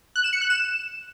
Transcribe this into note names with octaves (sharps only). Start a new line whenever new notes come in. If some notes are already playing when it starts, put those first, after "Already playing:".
F#6
E7
C#7
F#6
E7